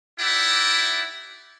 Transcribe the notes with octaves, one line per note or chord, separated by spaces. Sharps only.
D#4 E4 G4 D5 E5 F#5